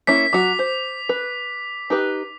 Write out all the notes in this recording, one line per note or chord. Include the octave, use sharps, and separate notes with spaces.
A#3 C#4 E4 B6
F#3 F#4 D6
C5
B4
D#4 G4 B4